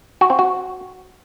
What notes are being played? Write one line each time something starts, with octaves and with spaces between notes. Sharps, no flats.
F#4
C4
F#4